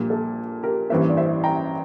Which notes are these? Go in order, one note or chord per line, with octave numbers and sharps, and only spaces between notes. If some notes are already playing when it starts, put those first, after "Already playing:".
Already playing: A#1 A#2 G3 A#3
A4
G4 A#4
A1 G2 E3 A#3 C5 E5
D5
C5 E5
G5 A#5